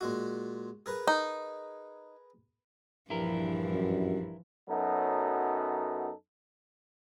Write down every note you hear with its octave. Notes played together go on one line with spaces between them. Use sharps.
A#2 G#3 F#4
G#4 A#4 B4
D#4
A#1 G2 E3 F3 E4 A#4
F#2
F#2 F#3 B3 D#4 A4